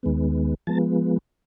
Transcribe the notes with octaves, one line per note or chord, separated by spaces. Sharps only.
D#2 D#3 G#3 B3
F3 G#3 B3 A5